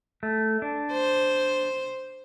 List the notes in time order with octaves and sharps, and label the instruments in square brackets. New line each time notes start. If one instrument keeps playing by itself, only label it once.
[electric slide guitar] A3
D4
[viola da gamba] C5